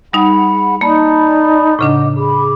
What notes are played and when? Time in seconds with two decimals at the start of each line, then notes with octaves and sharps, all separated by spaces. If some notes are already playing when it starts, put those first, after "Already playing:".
0.13 G3 D#4 G#4 F#5 B5
0.81 A#3 D#4 D5 A5 B5
1.79 A2 C#3 D4 D#5 F#5 D6
2.16 G#4 B5 D6